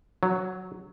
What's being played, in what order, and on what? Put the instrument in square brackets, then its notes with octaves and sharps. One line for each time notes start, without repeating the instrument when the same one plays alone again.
[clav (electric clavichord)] F#3